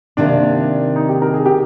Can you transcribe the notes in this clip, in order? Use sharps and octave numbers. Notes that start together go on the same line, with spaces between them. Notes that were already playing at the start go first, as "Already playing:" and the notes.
C3 D#3 A#3 D4
D#4
G4
A#4
G#4
G4